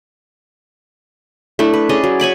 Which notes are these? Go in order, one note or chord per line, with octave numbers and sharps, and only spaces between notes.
A3 D4 E4
B4
C#4 G#4 D5 D#5
F#3
C#5 G#5 B5 D6